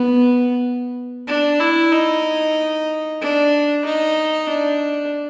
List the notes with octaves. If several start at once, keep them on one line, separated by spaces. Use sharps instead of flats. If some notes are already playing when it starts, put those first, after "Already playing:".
Already playing: B3
D4
E4
D#4
D4
D#4
D4